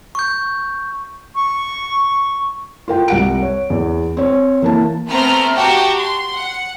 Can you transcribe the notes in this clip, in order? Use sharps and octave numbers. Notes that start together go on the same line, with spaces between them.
C#6 G6
C#6
F4 A#4 G5
C2 F#5 D7
C#5
E2
C4 C#5
E3 A#3 A5
A3 B3 C4 A#5 F6
F#4 G4 G5 A5 A#5
C6
F#5